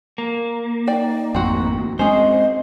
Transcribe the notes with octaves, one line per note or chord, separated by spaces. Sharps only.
A#3
D#4 D5 G5
G#1 F2 A2 C4 F#4
G#3 C4 C#4 G#4 C5 D#5